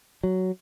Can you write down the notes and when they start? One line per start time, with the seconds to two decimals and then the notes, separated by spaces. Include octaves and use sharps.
0.23 F#3